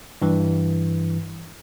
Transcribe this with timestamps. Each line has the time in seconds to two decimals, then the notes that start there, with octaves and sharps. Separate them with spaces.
0.22 G2 E3